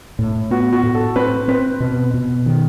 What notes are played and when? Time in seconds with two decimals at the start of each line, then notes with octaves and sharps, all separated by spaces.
0.19 A2
0.51 B3 F#4
0.73 F#4
0.83 A2
0.95 A4
1.16 C4 B4
1.48 C4 B4
1.80 B2
2.14 B2
2.46 D#3